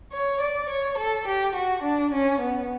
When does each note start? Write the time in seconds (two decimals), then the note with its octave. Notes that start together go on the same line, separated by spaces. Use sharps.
0.13 C#5
0.41 D5
0.69 C#5
0.97 A4
1.27 G4
1.55 F#4
1.83 D4
2.12 C#4
2.41 B3